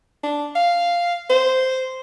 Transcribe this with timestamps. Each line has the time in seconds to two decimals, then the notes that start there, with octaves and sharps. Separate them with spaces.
0.24 D4
0.55 F5
1.30 C5